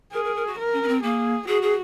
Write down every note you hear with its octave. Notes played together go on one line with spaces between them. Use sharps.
G#4 A#4
A#4
A#4
F#4
A#4
C#4
C#4
C4
A#3 G#4
F#4 G#4
G#4